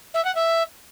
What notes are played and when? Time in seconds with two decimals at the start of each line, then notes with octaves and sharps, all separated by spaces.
0.14 E5
0.24 F#5
0.35 E5